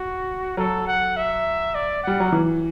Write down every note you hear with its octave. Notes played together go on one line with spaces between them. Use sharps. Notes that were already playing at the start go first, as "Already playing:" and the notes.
Already playing: F#4
F#3 A4
F#5
E5
D5
G3 F#5
F#3
E3